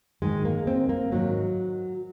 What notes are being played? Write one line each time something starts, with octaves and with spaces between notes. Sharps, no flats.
G#2 D#3 G#3
A#3
C4
A#3
G#2 D#3 F#3